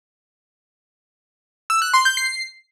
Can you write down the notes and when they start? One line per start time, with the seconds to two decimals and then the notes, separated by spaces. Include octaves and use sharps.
1.70 E6
1.82 F#6
1.94 C6
2.05 G6
2.17 C7